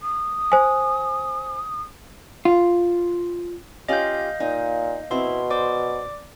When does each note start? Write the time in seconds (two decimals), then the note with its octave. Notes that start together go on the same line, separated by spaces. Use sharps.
0.01 D#6
0.52 C5 G#5
2.45 F4
3.88 C#4 F4 G4 D#5 F5 G6
4.40 A#2 D#4
5.11 B2 C4 E4 C6
5.50 C5 D5 D6